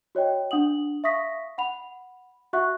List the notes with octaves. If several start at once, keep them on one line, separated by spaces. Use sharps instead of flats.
F#4 C#5 D#5 G5
D4 F#5 D#6 F#7
E5 F5 C#6 D#6 A#6 B6
F#5 B5 F7
F#4 E5 F#5 C#6 F#6